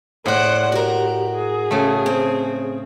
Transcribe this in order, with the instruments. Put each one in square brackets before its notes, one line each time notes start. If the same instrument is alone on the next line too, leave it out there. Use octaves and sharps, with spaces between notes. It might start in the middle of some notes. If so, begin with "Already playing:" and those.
[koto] A2 [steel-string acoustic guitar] G#4 D5 [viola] C5 F#5
[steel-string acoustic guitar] F#4 A#4 [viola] G4
[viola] G#4
[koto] C#3 A3
[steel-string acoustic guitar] C4